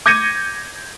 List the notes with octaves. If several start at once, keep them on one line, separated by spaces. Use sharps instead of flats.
D6 G6 G#6 A#6 C#7 D#7